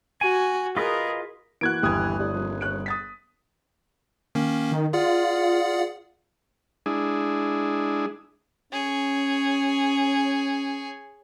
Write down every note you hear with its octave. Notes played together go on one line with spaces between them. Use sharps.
F#4 G#5
F4 G#4 A#4 B4 D#5
E3 A#3 F#4 F#6 G#6 D7
G1 D#2 E3 D#6 G#6
A2 G4 D5
D#1 F3
C#5 F#6 D7
D#6 A6 B6
D#3 A#3 C#4
D#3
F4 G#4 D5 F#5
G#3 D4 E4 G#4
C#4 G#4 C#5